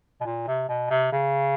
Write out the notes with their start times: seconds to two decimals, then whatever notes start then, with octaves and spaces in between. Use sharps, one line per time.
0.21 B2
0.25 A#2
0.48 C3
0.69 B2
0.90 C3
1.12 C#3